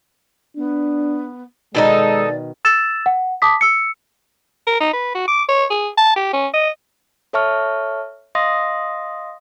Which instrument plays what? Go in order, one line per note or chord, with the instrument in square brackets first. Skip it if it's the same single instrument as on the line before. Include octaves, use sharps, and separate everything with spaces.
[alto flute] B3 [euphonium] D4
[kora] B2 D#3 B4 [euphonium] G#3 [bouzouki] D#4 E4 A4 [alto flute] D5
[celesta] E6 A6 E7
F#5
A5 D6 D#6 B6
E6 C#7
[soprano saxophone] A#4
D#4
B4
F#4
D6
C#5
G#4
A5
G4
C#4
D#5
[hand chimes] A4 C#5 E5 A5 C#6 F6
D#5 F5 C6 D#6 A#6